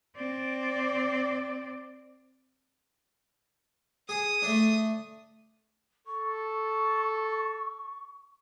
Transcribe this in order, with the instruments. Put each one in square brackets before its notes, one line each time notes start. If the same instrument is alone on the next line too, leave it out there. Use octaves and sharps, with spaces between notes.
[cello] C4 D5
[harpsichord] G#4 [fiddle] D#6
[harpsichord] A3 D4
[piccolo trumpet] A4 [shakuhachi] C#6